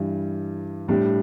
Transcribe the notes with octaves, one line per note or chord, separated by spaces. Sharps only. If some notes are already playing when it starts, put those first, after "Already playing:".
Already playing: G2 E3 G3
A2 G3 D4 G4